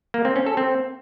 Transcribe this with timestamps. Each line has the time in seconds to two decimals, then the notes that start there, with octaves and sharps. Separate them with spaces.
0.14 A#3
0.25 C4
0.36 C#4
0.46 A4
0.57 C4